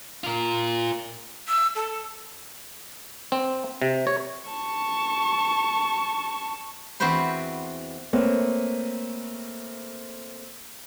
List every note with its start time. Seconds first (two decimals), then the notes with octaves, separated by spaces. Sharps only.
0.24 F4 A#4
1.48 E6
1.75 A4
3.32 C4
3.82 C3
4.07 C#5
4.49 A5 C#6
7.00 E2 C4 F#4 B4 C5 C6
8.13 A3 A#3 C4 B4 C#5